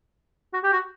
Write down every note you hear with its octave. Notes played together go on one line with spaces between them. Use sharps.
F#4
G4
F#4